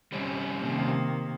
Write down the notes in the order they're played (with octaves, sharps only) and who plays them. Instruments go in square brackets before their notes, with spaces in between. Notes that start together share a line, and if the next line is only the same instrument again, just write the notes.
[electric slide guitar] G3 C4 C#4
[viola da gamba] C3 D#3 A#3